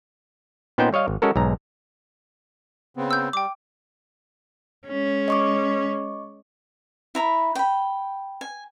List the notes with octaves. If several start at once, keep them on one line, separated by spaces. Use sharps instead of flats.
A#2 B3 C#4 D#4 C5 G5
G3 C#5 D#5 F5
G#1
G#3 C#4 F#4 A4 A#4
B1 G#2 A#5
C#3 B3 C4
E6 G6
G3 G5 D6
G#3 C#4
D#5 C#6 D6
E4 A#5 B5
G5 B5
G#5